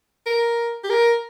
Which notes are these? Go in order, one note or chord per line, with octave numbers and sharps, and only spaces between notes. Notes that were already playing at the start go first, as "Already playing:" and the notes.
A#4
G4
A#4